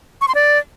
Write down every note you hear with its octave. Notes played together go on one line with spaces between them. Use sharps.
C#6
C6
D5